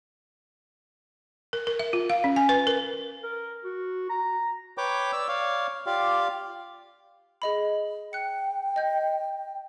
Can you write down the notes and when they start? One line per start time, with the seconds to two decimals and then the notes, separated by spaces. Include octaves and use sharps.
1.53 A#4
1.67 A#4
1.79 E5
1.93 F4
2.10 F5
2.24 C#4
2.36 G#5
2.49 B4
2.67 A#4
3.23 A#4
3.64 F#4
4.09 A#5
4.78 B4 C#5 G5 D6
5.13 D5 E6
5.29 C#5 D5 F5
5.86 F4 G4 D5 F5
7.42 G#4 D#5 B5
8.13 G5 F#6 C#7
8.76 D#5 G6